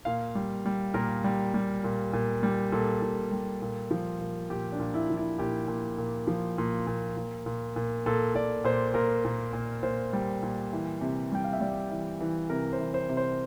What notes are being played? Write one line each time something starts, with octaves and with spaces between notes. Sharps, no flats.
A#2 F5
G3
G3
A#2 A#4
G3
G3
A#2
A#2
G3
A#2 A4
A#2
G3
A#2
F3
A#2
A#2 G4
D4
A#2
E4
F3
E4
A#2 G4
A#2
A#2
F3
A#2
A#2
A#2
A#2
A#2
A#2 A4
A#2 D5
A#2 C5
A#2 A#4
A#2
A#2
A#2 C5
G3
A#2
E3
C3
G3 G5
F5
E5
G3 D5
E3
E3
C3 A#4
C5
E3
C5
C3
C5